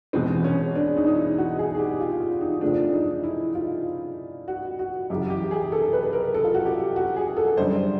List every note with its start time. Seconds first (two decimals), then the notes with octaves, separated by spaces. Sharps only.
0.13 E2 B2 G#3 C4
0.44 C#4
0.75 D4
0.97 D#4
1.07 D#4
1.17 E4
1.38 F#4
1.59 G#4
1.75 G#4
1.79 G4
2.00 F4
2.20 F4
2.41 D#4
2.61 F2 C#3 F3 A3 D4
2.92 D#4
3.23 E4
3.55 F4
4.48 F#4
4.79 F#4
5.10 F#2 C#3 E3 G4
5.30 G4
5.51 G#4
5.72 A4
5.93 B4
6.13 A#4
6.34 A4
6.44 F4
6.54 F#4
6.65 G4
6.96 F#4
7.16 G#4
7.37 A4
7.57 F#2 D3 G3 C5